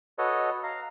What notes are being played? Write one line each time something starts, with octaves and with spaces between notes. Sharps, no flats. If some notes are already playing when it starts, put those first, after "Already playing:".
F#4 A4 B4 C#5 D#5
F5 A#5